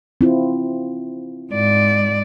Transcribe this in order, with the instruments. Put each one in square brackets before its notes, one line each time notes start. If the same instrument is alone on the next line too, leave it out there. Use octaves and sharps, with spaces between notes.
[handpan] C4 E4 F4
[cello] G#2 D5